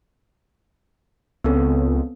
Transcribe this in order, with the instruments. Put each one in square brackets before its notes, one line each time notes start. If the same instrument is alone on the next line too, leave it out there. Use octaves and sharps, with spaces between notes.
[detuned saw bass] C#2 [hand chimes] B3 C4 A4